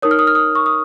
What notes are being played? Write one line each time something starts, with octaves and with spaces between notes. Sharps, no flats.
D#4 A#4 C#5 D#6
F6
D#6
F6
D#6
C#6
D#6